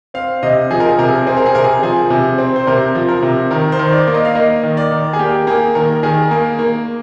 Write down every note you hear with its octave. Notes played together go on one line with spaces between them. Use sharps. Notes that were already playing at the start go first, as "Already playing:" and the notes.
C4 F5
C3 D#5
F3 G#4
A#4
G#4
C3 A#4
G#4
A#4
C4 G#4
A#4
G#4
C3 A#4
G#4
F3 G#4
C3
C4
C5
C3 A#4
F3
A#4
C3
D#3 A#4
C5
D#3
D5
A#3
D#5
F5
A#3 D#5
D#3
D5
D#3
G#4
A#3 G4
A#3 G#4
D#3 A#4
D#3 G#4
A#3
A#3